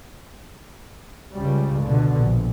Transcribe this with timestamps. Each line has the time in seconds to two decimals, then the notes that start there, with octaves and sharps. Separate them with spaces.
1.34 C#2 C#3 G3
1.83 B2 D3
2.17 A#1